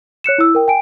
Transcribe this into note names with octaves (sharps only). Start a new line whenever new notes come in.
C#5 F#6 C#7 E7
E4 E6
A#4 G5
G5 G#5 D7